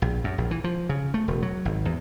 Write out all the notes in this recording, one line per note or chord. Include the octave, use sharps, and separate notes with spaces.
A#1
F#2
A#1
E3
F3
C#3
A3
E1
F#3
G#1
E2